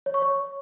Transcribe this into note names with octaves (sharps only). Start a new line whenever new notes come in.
C#5
C#6
C#5